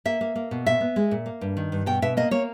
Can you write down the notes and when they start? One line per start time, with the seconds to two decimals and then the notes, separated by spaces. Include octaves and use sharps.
0.05 A#3 E5
0.21 A#3
0.36 A#3
0.51 B2
0.66 A#2 E5
0.81 B3
0.96 G#3
1.11 A#2
1.26 A#3
1.41 G2
1.57 D#3
1.72 G2
1.86 B2 G5
2.02 B2 E5
2.17 A#3 D#5
2.31 A#3 C#5